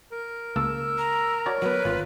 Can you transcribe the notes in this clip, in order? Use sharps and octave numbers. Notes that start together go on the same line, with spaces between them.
A#4
C#2 A#3 A5 E6
A#5
F#4 C#5 D5 A5
F#3 B3 B4
G#1 F4